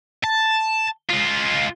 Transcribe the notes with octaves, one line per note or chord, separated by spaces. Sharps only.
A5
G#3 F4